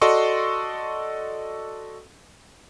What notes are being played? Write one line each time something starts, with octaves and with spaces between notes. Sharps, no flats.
F#4 A4 D5 D#5 C6 C#6